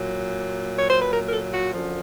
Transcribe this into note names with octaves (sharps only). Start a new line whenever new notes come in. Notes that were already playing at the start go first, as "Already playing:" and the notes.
Already playing: A#2 F#3
C#5
C5
B4
A#4
A#4
A4
F#4
F#2 D3 F3